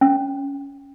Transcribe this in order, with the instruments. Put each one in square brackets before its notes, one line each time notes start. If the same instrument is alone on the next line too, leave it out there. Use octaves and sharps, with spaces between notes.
[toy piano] C#4